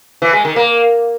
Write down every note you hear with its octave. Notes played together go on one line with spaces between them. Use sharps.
E3
G#3
D#3
A#3